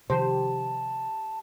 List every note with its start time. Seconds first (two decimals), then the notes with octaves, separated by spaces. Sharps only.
0.10 C3 D#3 F3 G4 C5 A5